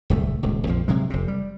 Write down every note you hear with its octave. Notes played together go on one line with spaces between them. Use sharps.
D1 C2 A3
D#1 C#2
A#1 F2 F3
C3 F#3 G#3
F1 C3
G3